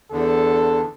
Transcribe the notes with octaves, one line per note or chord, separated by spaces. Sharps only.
E2 D3 A4